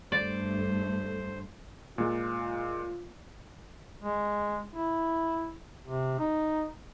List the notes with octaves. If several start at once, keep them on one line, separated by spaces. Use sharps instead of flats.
G2 A3 C5 D5
A#2 G#3 F4
G#3
E4
C3
D#4